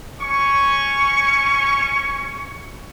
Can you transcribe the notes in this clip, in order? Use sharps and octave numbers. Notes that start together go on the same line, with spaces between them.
C#4 C#6